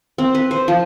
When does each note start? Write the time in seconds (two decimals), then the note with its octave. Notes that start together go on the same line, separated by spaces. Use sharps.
0.18 C4
0.35 B4
0.51 C5
0.68 F3